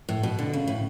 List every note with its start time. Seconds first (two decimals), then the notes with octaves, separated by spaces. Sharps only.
0.09 A2
0.23 B2
0.39 D3
0.53 C#3
0.68 A2